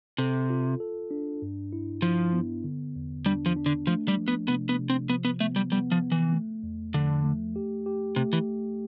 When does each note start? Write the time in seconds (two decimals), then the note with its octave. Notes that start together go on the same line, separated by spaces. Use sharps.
0.18 C3 A4
0.50 F4
0.80 A4
1.11 D4
1.42 G2
1.73 E4
2.02 F3 E4
2.33 B3
2.64 D3
2.96 E2
3.26 G3 D4
3.46 F3
3.56 D4
3.66 D3
3.87 F3 A3
4.08 G3
4.17 F3
4.28 B3
4.48 C3 B3
4.69 B3
4.79 C3
4.90 C4
5.09 F3 B3
5.25 B3
5.40 A3 B3
5.56 G3
5.72 G3 B3
5.92 F3
6.02 B3
6.12 E3
6.32 A3
6.63 E2
6.94 D3 F3
7.24 A3
7.56 G4
7.86 G4
8.16 C3 A3
8.33 E3